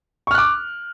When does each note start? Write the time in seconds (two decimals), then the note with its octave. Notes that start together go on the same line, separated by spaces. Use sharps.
0.27 C#6
0.31 F6
0.34 F#6
0.38 D6